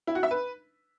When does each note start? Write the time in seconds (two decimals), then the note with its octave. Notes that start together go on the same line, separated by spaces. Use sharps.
0.07 E4
0.15 F#4
0.23 E5
0.31 B4